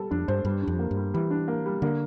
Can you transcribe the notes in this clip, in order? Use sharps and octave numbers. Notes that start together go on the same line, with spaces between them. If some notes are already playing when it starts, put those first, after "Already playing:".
Already playing: G3 A4
F2 D4
G2 C5
G2 G3
D4
F2
A#3
G2
G3
E3 G3
D4
A#3
G3
D3 A#3